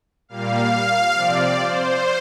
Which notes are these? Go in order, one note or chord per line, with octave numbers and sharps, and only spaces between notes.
A#2 G3 A#3 F5
C3 F3 C4 D5
C5